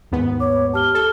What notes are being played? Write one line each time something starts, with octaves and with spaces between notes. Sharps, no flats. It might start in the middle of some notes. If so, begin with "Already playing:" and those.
D#2 G#2 B3
C#5 D6
G4 A5 F6 G7
A4 F6 G7